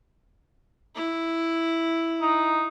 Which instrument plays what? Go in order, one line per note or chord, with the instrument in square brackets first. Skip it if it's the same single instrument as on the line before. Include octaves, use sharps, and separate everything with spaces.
[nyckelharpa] E4
[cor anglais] D#4